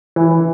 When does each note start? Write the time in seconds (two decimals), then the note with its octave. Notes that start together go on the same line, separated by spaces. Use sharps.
0.16 E3